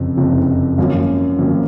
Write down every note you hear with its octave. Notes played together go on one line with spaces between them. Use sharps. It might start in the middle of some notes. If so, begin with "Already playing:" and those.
Already playing: F#1 F2 C3
F#1 F2 C3
G#1 F#2 F3 A#3 C#4
G#1 F#2 F3 A#3 C#4